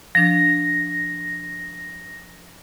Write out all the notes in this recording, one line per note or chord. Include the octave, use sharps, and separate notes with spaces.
F3 D4 A#6